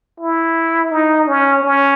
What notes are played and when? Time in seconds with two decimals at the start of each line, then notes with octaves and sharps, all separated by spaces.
0.20 E4
0.91 D#4
1.27 C#4
1.63 C#4